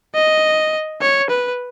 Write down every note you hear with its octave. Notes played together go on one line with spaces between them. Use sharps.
D#5
C#5
B4